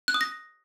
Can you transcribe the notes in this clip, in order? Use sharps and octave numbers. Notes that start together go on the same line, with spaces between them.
F#6
D#6
A#6